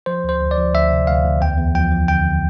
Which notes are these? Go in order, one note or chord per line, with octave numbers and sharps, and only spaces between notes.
F3 C5
D2 C5
D2
D5
F3
D2 E5
C3
D2 F5
D2
E2 G5
E2
F3 G5
F3
D3 G5
D3